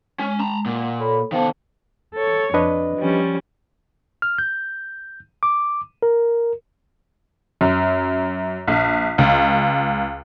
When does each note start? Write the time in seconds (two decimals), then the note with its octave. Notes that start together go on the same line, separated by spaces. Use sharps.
0.19 G#3 C#4
0.40 A5 A#5
0.66 A#2 F#5
0.99 A4 C#5 B5
1.32 D#3 B3 A4 C5 F5
2.15 A4 C#5
2.54 F2 D4 B4 D#5
2.97 F3 G3 C#4
4.22 F6
4.38 G6
5.43 D6
6.02 A#4
7.61 F#2
8.68 A#1
9.18 C#2